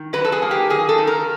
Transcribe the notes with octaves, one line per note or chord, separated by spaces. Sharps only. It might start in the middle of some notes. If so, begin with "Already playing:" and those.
Already playing: D#3
F#3 B4
A4
G#4
A#3
G4
D#3 G#4
A4
D#3
A#4